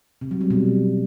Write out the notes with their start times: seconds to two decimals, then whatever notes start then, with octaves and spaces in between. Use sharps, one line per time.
0.21 C3
0.31 F#3
0.41 G3
0.50 B2